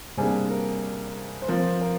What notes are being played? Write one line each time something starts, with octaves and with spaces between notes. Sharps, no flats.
C3 G3 A#3 D4 G#4
A#4
C5
F3 C4 A#4
A#4